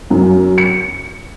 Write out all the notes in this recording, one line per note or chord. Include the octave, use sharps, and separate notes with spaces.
F#2
C#7